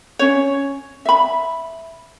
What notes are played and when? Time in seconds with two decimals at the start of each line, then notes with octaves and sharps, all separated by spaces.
0.19 C#4 C#5
1.05 E5 B5